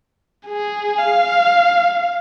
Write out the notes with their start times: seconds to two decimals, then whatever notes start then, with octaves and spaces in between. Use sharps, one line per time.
0.47 G#4
0.99 F5